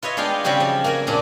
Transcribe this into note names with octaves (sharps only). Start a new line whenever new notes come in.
F4 B4 C#5 D#5 E5
G#3 B3 D4 F4 F5 G5
C#3 G3 C4 F#4 G4
F3
A#3 F#4 A#4 G#5
F2 A#2 C#4 D4